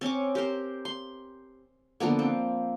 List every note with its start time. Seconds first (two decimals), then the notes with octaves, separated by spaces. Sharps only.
0.01 C4 C#4 C#6 D6
0.35 G4 A#4 C5
0.85 C6
2.00 D3 F3 A#3 B3
2.19 C4